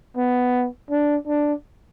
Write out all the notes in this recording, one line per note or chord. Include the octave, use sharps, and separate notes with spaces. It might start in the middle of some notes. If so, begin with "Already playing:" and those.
B3
D4
D4